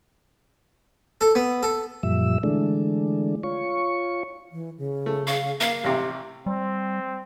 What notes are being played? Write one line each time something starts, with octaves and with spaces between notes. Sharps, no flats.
A4
B3
A4
F#2 A#2 F3 G3 E5 E6
D3 E3 G#3 A3 D4
F4 C#5 C#6
E3
C#3
A3
F5 C#6
A#3 F5
A1 C3 G4
G3 C4